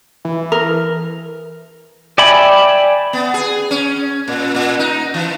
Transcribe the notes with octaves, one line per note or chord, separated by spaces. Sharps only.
E3
A#4
D5 E5 G5 G#5 B5
B3
G#4
C#4
A#2
A#2
D#4
E3